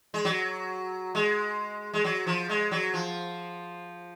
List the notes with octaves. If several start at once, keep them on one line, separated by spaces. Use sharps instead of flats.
G#3
F#3
G#3
G#3
F#3
F3
G#3
F#3
F3